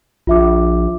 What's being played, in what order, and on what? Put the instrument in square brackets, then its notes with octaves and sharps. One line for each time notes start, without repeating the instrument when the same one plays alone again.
[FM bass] A#1 [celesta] F4 E5 D6